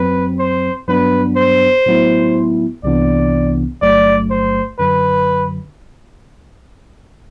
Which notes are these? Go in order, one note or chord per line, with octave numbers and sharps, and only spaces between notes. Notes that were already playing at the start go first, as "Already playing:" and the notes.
Already playing: F#2 F#3 C4 B4
C5
G2 F#3 B3 D4 B4
C5
A2 F#3 B3 E4
C2 C3 E3 B3 D4 D5
G1 G2 F#3 A3 D5
C5
F#2 D3 F#3 B4